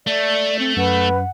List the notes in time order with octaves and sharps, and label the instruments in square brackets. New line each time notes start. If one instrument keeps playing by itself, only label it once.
[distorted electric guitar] A3 [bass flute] D5
[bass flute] C4
[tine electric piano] F#2 [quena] B4 [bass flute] F#5